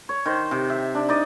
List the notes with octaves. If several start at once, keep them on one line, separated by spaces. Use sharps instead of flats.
C#5
D#3 C5
C3
E5
D4
D#4 D5 D#5